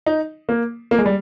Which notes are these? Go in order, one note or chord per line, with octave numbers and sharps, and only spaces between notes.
D#4
A#3
A#3
G#3
G3